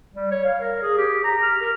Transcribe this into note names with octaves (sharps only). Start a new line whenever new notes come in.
G3
C#5
F5
A#4
G#4
G4
A#5
F6
A#4